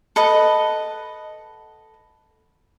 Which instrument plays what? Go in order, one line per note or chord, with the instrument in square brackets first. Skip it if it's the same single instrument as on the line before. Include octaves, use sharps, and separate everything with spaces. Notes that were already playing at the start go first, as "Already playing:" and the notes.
[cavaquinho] A4 B4 D#5 F#5